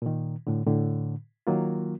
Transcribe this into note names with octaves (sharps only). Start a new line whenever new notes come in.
A#2 D#3
A2 D3
A2 D3
D#3 F#3 A#3 F4